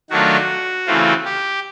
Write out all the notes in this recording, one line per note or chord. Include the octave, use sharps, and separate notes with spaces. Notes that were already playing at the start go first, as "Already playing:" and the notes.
D#3 F#3 A3 D4 F4 F#4
C#3 E3 A3 C4 F4
G4